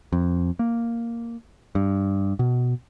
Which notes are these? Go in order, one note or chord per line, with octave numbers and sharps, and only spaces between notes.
F2
A#3
G2
B2